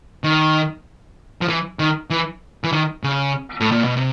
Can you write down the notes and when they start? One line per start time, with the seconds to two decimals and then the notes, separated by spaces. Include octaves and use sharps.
0.24 D#3
1.41 F3
1.48 E3
1.79 D#3
2.10 E3
2.64 E3
2.73 D#3
3.04 C#3
3.60 A2
3.72 A#2
3.84 B2
3.96 C3